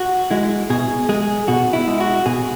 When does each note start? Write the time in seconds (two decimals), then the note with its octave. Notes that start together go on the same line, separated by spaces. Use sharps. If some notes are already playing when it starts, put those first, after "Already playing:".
Already playing: F#4
0.31 G#3 E4
0.70 B2 G#4
1.09 G#3 G#4
1.48 B2 F#4
1.73 E4
1.87 G#3
2.00 F#4
2.26 B2 G#4